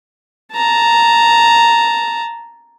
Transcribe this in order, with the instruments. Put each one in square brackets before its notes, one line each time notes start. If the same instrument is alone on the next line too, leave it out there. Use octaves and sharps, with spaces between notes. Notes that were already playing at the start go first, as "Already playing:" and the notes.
[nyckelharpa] A5 A#5